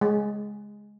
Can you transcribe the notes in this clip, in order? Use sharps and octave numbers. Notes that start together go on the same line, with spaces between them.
G#3